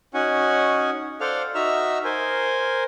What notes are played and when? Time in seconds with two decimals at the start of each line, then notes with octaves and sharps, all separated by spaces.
0.14 C#4 D#4 F#4 F#5 G#5
1.21 A4 C5 D5 F5 F#5 F6
1.55 D#4 F#4 E5 A#5 E6 F6
2.04 A#4 C5 G#5